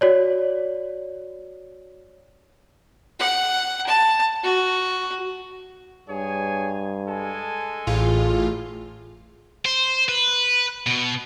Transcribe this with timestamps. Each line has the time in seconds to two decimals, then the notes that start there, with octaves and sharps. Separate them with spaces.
0.01 F#4 C#5 D5
3.19 F#5
3.87 A5
4.43 F#4
6.09 G2 G#4 C#5 G#5
7.07 G#3 A4 G#5
7.87 A1 A2 F4 G#4
9.65 C5
10.09 B4
10.87 B2